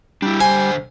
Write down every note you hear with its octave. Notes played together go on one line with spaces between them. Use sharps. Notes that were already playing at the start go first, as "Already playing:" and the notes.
G3 D4 E4
D3 C5 G#5